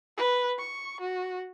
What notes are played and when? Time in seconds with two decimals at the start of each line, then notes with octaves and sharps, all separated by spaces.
0.17 B4
0.59 C#6
1.01 F#4